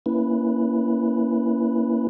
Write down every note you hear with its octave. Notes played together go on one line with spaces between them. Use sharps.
A#3 C#4 E4 B4